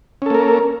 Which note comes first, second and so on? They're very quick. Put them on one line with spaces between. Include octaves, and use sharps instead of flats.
C#4 A4 A#3 A#4